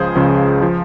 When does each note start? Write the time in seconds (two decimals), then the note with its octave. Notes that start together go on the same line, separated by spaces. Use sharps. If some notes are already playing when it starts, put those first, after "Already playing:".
Already playing: C#2 C#3 F3 G#4 C5
0.15 C#2 C#3 F3
0.62 F3